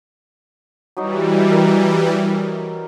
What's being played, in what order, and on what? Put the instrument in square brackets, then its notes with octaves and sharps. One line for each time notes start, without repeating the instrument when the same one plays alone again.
[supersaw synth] E3 G3 [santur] F#3 D#4 F#4
[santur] A#4